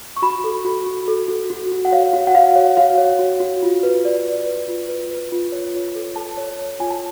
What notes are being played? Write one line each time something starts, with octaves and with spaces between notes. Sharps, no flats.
C#6
F#4 B5
A4
F#4
F#4
A4
F#4
F#4
F#4
F#5
C#5 F5
F#4
F#5
F#4 F5
C#5
F#4 F5
C#5
F#4
F#4
F4
B4
D5
D5
B4
F4
B4
B4
F4
C#5
F4
A4
A4 A5
C#5
C#5
F4 G#5
A5